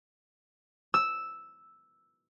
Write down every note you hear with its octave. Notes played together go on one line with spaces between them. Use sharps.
E6